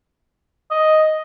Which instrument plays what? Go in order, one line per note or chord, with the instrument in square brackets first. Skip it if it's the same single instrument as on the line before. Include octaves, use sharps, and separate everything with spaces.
[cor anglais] D#5